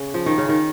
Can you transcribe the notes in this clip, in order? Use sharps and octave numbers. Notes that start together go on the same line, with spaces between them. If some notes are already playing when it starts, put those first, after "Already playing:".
Already playing: C#3
F3
D#3
C#3
D#3